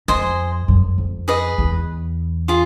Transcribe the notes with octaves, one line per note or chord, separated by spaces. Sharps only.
F2 C5 D#5 G#5
F#2
F2
G#4 B4 D#5
E2
F4 G#4